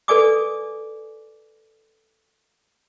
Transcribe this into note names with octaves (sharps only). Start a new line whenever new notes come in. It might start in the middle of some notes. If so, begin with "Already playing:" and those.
A4 B4 D5 G#5 D6 D#6